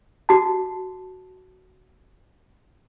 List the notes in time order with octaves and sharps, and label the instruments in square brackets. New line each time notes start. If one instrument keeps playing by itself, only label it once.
[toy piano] F#4 A5